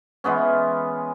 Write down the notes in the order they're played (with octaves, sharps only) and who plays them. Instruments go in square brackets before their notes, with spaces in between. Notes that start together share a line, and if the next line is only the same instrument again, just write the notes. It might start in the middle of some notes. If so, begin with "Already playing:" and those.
[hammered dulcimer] E3 G#3 B3 C#4